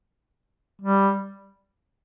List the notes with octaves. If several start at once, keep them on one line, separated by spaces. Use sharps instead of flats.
G3